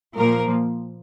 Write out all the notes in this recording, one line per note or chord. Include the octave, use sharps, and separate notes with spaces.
A#2 F3 A#3 A#4